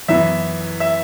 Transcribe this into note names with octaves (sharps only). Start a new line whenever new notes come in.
F#2 E3 B3 E5
E5